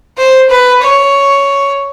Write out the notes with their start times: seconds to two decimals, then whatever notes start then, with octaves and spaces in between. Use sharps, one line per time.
0.18 C5
0.50 B4
0.82 C#5